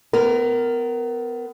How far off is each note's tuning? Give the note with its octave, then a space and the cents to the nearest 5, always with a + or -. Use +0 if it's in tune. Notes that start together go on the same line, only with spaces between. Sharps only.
B3 +30 A#4 +0